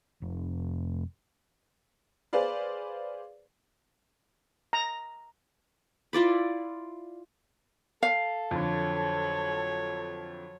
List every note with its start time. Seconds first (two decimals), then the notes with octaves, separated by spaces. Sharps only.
0.22 F1
2.33 G#4 B4 C5 D5 F5
4.73 A#5
6.13 E4 F4 D5 B5
8.03 A4 F5
8.51 F2 D3 F#3 C#5